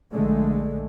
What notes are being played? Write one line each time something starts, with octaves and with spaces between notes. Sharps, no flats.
A#1 D3 G#3 A3